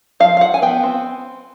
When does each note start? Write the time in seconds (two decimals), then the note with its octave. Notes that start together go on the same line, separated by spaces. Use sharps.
0.20 F3 F5
0.37 F5
0.41 F3 F#5
0.54 G#5
0.62 B3 G5
0.83 C4